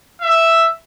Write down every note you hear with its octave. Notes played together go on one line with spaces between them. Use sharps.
E5